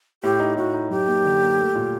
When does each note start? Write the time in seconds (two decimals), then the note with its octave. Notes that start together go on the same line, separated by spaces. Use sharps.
0.23 A2 G4
0.40 D#4
0.57 A2 F#4
0.74 D#4
0.90 F#2 G4
1.07 A#3
1.25 D3
1.42 A#3
1.59 A3
1.75 A#2